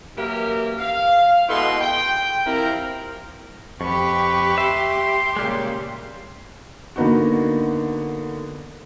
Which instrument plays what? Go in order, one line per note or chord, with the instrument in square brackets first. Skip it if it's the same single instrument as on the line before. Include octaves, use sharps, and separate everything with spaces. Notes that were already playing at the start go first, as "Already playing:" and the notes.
[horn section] F#2 E3 A#3 G4 A#4 E5
F5
B2 G#3 E4 A4 B4 C6
G5
C3 F3 C4 E4 A#4
[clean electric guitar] F2 [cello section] G4 [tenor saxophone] B4 [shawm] C#6
[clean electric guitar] E5 [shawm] C6
[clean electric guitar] A#2 G3 G#3 [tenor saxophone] C#3
[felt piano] D3 A#3 B3 D#4 F#4